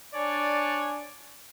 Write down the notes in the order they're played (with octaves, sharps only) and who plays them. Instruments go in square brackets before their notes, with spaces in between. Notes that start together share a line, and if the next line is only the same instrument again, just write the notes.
[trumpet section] D4 C#5 D5 G#5